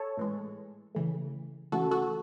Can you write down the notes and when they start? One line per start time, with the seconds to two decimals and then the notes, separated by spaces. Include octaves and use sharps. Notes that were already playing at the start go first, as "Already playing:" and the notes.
Already playing: A4 C#5
0.17 A2 E3 G#3
0.95 C#3 E3 A3
1.72 C#3 E3 A3 F#4 A4
1.91 F#4 A4